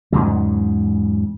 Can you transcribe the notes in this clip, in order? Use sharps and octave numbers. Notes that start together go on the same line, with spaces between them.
E2 G#2 C#3 F#3